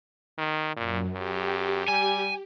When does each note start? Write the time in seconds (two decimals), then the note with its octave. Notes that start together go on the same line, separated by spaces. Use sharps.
0.38 D#3
0.77 F#2 A#2
1.13 F#2 G4
1.88 G3 G#5